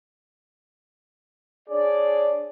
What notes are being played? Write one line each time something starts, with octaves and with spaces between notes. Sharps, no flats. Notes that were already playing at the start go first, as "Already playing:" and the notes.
D4 G#4 C#5 D5